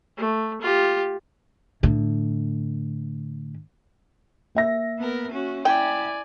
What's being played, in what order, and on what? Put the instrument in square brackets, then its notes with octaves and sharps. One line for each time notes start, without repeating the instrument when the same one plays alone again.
[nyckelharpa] A3
F4 G4
[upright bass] A2 D3
[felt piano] A#3 E5 A#6
[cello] B3 A#4
C#4 F#4
[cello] E4 [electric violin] D5 G#5 [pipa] G5